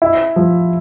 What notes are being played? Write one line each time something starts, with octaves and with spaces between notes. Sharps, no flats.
E4
F3